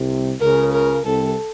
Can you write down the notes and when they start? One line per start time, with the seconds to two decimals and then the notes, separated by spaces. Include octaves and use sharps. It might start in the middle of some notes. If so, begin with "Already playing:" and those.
Already playing: C2 C3
0.40 C#2 C#3 A#4
0.72 A#4
1.05 C2 C3 A4